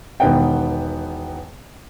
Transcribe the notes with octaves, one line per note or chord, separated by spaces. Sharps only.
E1 D#3 B3 B4 F#5 G5